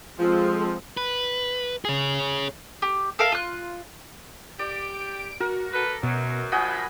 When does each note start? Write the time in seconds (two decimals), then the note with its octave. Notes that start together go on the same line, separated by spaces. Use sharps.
0.19 F3 G#3 C4 F4 A4
0.97 B4
1.85 G#4 C#5
2.82 G4
3.19 A4 A#4 F5
3.32 F4 F#6
4.59 G4 D5 D7
5.40 F#4 A#4
5.73 A4 B4
6.03 F#2 B2
6.52 G2 F3 F#4 D#5 G#5 B5